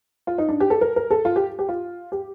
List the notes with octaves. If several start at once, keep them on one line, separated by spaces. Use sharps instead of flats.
F4
D#4
D4
G4
A4
A#4
A#4
A4
F4
G4
G4
F4
G4